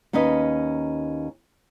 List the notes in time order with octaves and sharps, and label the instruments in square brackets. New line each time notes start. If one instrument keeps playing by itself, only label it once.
[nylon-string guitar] D#2 C#4 D#4 B4 D#5